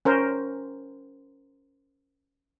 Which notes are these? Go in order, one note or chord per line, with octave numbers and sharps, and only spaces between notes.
C#4 A#4 C5